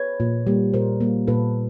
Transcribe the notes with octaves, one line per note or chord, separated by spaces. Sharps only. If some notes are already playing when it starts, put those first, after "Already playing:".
Already playing: B4 C#5
A#2
G3 A#3
A#2 A#4 C5
G3 A#3
A#2 A4 B4